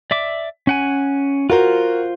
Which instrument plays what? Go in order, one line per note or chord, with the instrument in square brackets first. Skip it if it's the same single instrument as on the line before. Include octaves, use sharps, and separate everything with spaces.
[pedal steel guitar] D5 E5 D6
C#4 F#5 G#5
[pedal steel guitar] F4 C5 [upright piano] F#4 A#4